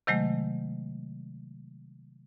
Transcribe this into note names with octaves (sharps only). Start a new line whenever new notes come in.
C3 D#3 F#3 G#3 A3